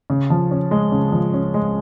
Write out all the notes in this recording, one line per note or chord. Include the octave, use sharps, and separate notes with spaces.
C#3
F3
C#4
G#3
C#3
F3
C#4
G#3